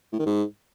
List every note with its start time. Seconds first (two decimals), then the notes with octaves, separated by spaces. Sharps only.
0.13 A2
0.19 D#3
0.26 G#2